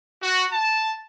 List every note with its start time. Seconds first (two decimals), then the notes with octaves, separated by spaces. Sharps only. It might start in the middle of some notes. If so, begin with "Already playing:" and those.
0.22 F#4
0.52 A5